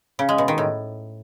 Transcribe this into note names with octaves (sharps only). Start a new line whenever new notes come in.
C#3
G#3
B2
D#3
A2